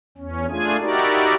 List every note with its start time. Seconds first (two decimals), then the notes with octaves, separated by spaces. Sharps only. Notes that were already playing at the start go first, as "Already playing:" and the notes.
0.18 E2 C#4
0.50 A3 D4 F4 G#4 G#5
0.81 D#4 E4 F#4 G4 A#4 D5